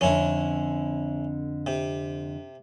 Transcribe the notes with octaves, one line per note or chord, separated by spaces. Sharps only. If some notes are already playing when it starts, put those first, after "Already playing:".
F2 D3 C#4 E4
C3